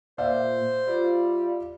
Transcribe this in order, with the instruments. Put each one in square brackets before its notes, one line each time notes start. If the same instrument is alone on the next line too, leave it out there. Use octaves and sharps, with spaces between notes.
[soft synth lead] A#2 [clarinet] C5 [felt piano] D5 E5 F5
[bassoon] G3 [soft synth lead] F4